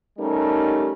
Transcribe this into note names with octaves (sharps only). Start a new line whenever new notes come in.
G3 A3 C#4 D#4 G4 A#4